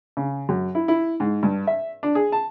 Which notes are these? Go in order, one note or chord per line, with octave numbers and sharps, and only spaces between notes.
C#3
F#2
E4
E4
G#2
G2
E5
D4
G#4
A5